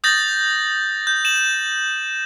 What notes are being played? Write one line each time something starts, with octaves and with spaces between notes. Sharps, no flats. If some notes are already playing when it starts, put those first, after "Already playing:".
D#6 G6 A6 A#6 F#7
G6
E7 F#7